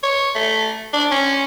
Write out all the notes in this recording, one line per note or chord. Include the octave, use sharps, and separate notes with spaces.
C#5
A3
D4
C#4